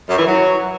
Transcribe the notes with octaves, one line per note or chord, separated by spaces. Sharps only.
F#2
E3
F#3